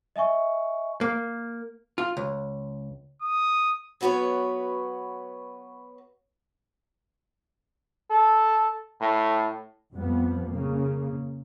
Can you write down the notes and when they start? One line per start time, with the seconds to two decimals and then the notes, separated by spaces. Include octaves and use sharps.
0.16 D#5 E5 G#5 C#6
1.01 A#3
1.98 F4
2.17 C#2
3.22 D#6
4.01 F#3 B3 F#4 B4 C#5
8.10 A4
9.01 A2
9.93 F2 F3 G3 B3
10.49 C#3 A#3